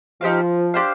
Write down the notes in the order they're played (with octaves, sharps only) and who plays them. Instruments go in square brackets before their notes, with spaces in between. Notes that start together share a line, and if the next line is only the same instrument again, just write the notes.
[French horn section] F3 [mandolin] D#4 G4 C5 F5
[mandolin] D4 G4 C5 F5